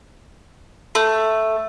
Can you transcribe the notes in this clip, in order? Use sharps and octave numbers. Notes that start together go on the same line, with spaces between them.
A3